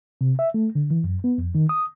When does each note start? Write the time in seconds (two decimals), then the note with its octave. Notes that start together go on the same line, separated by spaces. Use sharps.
0.21 C3
0.39 E5
0.54 A3
0.75 D3
0.91 E3
1.04 F#2
1.24 B3
1.38 F2
1.55 D#3
1.69 D#6